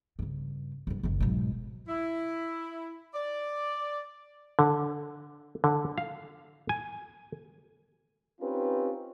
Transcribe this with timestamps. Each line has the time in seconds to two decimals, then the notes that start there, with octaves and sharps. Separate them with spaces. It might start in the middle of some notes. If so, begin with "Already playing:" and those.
0.19 G2 C#3
0.87 G2 D3
1.03 F#1 D#2
1.20 B1 G#2
1.88 E4
3.14 D5
4.59 D3
5.64 D3
5.98 F5
6.69 G#5
8.41 C4 C#4 D#4 F4 G4 B4